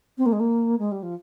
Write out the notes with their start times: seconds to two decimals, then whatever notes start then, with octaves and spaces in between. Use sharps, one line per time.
0.17 C4
0.25 A#3
0.32 G#3
0.39 A#3
0.78 G#3
0.91 G3
1.02 F3